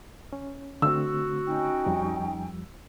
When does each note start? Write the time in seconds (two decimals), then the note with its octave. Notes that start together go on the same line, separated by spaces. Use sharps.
0.33 C#4
0.82 D3 A3 C4 F#4 E6
1.46 C#4 D#4 G5
1.86 F2 F3 G3